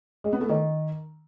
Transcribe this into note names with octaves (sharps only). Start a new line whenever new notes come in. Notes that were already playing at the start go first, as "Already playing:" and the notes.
G#3
B3
A3
D#3